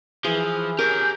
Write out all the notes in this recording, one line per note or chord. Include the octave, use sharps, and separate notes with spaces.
E3 F3 G#4
C#4 G4 A#4 G#5 G6